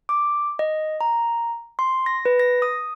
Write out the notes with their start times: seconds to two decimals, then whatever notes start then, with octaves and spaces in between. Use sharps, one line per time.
0.09 D6
0.59 D#5
1.01 A#5
1.79 C6
2.06 A#6
2.25 B4
2.40 A#6
2.62 D#6